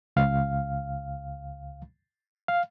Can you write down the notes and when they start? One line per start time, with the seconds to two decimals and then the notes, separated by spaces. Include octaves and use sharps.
0.16 C#2 F5
2.48 F5